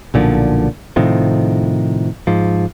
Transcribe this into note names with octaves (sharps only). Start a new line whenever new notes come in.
B1 A#2 D3 F3
A2 C3 D#3 F3
G#2 F3